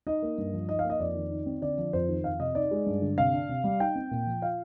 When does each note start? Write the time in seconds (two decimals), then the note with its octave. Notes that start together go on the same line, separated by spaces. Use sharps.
0.07 D#4 D#5
0.22 A#3
0.38 G2
0.53 F3
0.69 D#4 D#5
0.79 F5
0.84 A#3
0.90 D#5
1.00 F2 D5
1.15 D#3
1.31 D#4
1.46 C4
1.62 D3 D5
1.78 F3
1.93 F2 C5
2.09 D#3
2.24 F2 F5
2.40 C3 D#5
2.55 D#4 D5
2.71 G#3
2.86 G2
3.02 D3
3.18 C3 F5
3.34 D4
3.49 C3
3.64 G3
3.80 D#4 G5
3.95 C4
4.11 A#2
4.26 F3
4.42 F4 F5